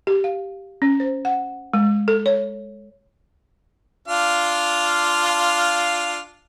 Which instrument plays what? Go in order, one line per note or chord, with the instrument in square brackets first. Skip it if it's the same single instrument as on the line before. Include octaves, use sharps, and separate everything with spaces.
[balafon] G4
F5
C#4
C5
F#5
G#3
A4
C#5
[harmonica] D4 F4 F5